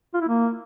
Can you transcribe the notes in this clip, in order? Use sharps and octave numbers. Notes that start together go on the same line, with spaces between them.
F4
E4
A#3